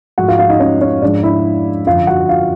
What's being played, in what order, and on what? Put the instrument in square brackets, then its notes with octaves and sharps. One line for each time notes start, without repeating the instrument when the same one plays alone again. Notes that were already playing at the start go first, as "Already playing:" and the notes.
[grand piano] G#2 F3 A3 F#4 F#5
F4 F5
F4 F5
D#4 D#5
C#4 C#5
C#4 C#5
G#2 F3 G#3 D4 D5
E4 E5
F#2 D3 F3 F4 F5
F#4 F#5
F4 F5